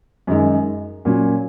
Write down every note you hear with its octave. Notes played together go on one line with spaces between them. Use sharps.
F#2 D#3 G#3
A#2 F#3 C#4